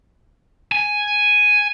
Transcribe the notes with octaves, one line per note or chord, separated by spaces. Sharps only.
G#5